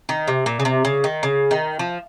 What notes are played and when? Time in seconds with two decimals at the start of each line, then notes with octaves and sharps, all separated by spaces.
0.09 D#3
0.28 C3
0.46 A#2
0.60 C#3
0.65 C3
0.85 C#3
1.04 D#3
1.23 C#3
1.51 D#3
1.79 F3